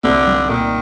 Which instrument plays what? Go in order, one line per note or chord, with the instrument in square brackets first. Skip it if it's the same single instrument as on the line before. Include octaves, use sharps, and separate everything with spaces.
[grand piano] C2 [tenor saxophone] D3
[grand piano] G3
[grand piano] A#2 [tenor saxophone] D#3